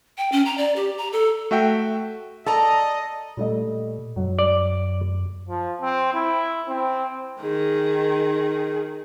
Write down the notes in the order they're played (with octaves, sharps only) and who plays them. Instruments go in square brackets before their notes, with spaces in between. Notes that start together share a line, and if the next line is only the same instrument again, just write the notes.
[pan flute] G5
C#4
A#5
D5
G4
A#5
A4
[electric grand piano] A3 F#4 E5 G5
[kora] A4 [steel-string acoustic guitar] D5 A5 A#5 [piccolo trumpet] D#5
[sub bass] A#2 [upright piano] G3 A3 D#5
[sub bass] F#2 [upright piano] F#3
[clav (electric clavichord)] D5
[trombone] F3
C4
E4
C4
[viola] D#3 G#4